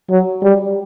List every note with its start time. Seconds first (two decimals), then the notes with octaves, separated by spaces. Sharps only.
0.10 F#3
0.42 G3